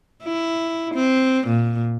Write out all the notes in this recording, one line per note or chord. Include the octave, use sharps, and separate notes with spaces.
E4
C4
A#2